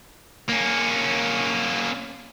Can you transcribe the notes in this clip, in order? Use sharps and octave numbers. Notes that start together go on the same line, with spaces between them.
A#3 C#4